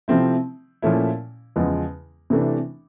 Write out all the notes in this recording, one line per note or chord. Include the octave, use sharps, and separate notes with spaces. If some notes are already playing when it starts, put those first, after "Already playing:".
C3 F3 A3 C4 E4
A#2 F3 A3 C#4 E4
E2 C#3 F3 G#3 B3
C3 E3 A3 D4